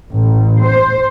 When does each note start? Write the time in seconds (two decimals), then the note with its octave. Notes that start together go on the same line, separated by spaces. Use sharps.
0.11 A1
0.64 C5